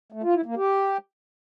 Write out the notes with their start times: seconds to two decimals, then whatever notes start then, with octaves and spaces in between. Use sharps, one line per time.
0.12 A3
0.23 F4
0.35 E4
0.46 A#3
0.57 G4